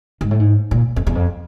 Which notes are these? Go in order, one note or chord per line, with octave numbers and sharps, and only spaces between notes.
G#2
A2
G#2
A#2
F2
E2
F2